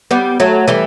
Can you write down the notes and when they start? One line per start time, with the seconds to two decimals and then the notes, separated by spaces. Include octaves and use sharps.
0.11 G3 B3
0.40 F#3 A3
0.68 E3 G3